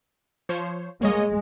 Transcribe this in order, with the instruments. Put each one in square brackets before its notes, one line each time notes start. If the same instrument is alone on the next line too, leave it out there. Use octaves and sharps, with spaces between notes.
[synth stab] F3 C5 C#5
[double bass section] G#3 [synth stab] A#3 C#5 D#5